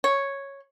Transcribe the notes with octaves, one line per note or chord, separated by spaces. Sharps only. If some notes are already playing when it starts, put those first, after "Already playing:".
C#5